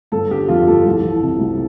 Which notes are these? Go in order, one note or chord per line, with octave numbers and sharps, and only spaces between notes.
G1 A4
D3 G4
F2 F4
G1 A4
C2
E3
C3
C2